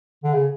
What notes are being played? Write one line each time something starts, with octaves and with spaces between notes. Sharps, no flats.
D3
C#3